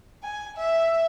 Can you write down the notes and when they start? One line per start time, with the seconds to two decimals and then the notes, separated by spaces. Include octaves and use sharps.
0.23 G#5
0.57 E5